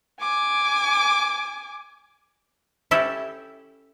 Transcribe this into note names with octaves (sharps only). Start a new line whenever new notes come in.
G#5 D6
C#4 E4 G4 A4 E5 G5